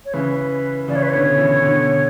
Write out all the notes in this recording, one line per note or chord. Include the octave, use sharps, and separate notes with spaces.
C#5
C#3 E3 B4
C#3 E3 D5
C#5
B4
B2 D3 C#5
C#3 E3
B2 D3